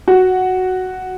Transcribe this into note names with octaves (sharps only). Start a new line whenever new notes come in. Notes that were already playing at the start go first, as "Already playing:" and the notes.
F#4